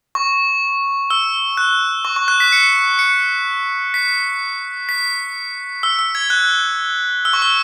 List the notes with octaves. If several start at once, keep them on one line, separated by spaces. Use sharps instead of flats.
C#6
E6
F#6
C#6
C#6
F#6
B6
C#7
C#7
B6
B6
E6
E6
G#6
F#6
E6
C#6
E6